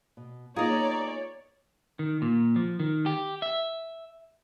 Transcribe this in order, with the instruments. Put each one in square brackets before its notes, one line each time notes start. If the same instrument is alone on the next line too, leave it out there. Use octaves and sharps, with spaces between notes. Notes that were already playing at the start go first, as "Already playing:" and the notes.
[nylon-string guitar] B2
[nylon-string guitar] A#3 B3 F4 [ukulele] D#4 G#4 [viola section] C#5 D5 [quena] A#5
[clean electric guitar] D#3
A#2
F3
D#3
G4
E5